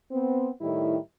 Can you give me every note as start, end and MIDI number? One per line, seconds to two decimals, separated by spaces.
0.11 0.50 59
0.11 0.50 60
0.61 0.96 45
0.61 0.96 51
0.61 0.96 55
0.61 0.96 64